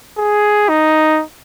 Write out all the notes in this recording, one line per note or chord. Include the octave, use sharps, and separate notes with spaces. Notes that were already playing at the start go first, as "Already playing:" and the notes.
G#4
D#4